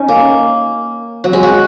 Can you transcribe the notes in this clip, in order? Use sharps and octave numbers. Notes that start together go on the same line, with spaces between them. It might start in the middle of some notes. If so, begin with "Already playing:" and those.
Already playing: C#4 D#4
A#3
F#3
G#3
F#4